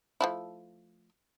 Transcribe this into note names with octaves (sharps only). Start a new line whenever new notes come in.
F3 A3 E4